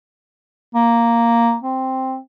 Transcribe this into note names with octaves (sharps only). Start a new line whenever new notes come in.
A#3
C4